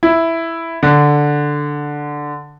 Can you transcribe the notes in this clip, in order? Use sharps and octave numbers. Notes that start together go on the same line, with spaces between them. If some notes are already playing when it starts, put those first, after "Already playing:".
E4
D3